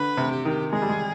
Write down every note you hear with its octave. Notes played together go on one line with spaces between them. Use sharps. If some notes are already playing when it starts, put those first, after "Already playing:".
Already playing: D3 B4
C3
G4
D#3
G#3 G#4
G3
G#3